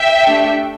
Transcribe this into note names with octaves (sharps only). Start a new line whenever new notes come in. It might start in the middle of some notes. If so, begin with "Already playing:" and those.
Already playing: E5 G5
A3 D4 G4